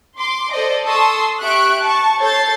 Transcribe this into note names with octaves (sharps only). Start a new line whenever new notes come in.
C6 D6
A4 C5 D5 D#5
A4 A5 C6 C#6 D#6 E6
G4 E5 C#6 F#6 D7
A5 C#6
A4 C#5 G6 A6 C7